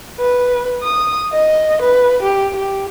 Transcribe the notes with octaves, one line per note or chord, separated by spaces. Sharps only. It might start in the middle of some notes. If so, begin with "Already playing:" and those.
B4
D#6
D#5
B4
G4
G4